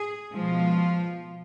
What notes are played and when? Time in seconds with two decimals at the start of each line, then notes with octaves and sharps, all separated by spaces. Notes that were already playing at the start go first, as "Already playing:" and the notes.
Already playing: G#4
0.34 B2 F3 G#3 F4